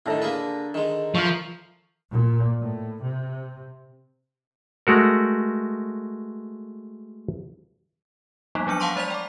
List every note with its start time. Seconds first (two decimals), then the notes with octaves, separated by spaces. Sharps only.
0.06 A2 D3 D#3 A4 A#5
0.22 A#3 G#4 B4
0.74 D#3 G#3
1.15 F3 A#4 E5 C#6
2.10 A#2
2.61 A2
3.02 C3
4.87 G#3 A3 F#4 A#4
8.55 F3 G3 A#3 B3 D#4
8.67 F3 F#3 D4 E6 C#7
8.80 F5 F#5 A5 C6 C#6
8.96 G#3 C5 D5 A#5 B6 F7
9.10 G5 D6